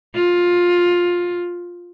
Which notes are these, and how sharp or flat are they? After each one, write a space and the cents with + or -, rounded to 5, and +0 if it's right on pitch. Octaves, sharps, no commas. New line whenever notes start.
F4 +15